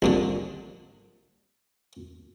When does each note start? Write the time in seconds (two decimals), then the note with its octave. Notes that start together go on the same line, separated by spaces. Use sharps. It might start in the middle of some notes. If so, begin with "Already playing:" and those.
0.02 C2 A#2 D3